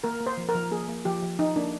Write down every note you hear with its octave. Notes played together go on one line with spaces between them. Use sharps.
A#3 A#4
A#3
C5
F3
A#4
F3
A#3 G#4
A#3
F3 G4
F3
F3 D#4
A#3 D4